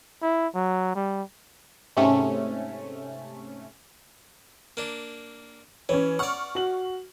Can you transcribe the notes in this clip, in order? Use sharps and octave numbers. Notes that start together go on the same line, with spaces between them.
E4
F#3
G3
G#2 C3 A3 C#4
A#3 D4
E3 C#4 C#5
D5 F#5 C#6 F6
F#4 F#7